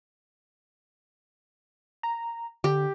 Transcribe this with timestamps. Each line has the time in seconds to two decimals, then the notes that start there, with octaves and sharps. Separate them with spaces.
2.03 A#5
2.64 D3 G4